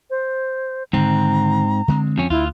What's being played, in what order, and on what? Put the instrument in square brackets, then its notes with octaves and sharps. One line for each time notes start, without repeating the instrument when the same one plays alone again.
[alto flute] C5
[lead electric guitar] G#2 C4 [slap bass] D3 D#3 [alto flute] A#5
[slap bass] D3 G#3 C4
[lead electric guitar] F2 C#4
[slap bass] D2 [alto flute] E4 [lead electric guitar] F4